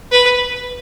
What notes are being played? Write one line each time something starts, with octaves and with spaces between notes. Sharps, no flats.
B4